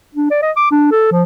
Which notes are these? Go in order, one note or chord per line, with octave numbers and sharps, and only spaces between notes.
D4
D5
D#5
D6
D4
A4
F3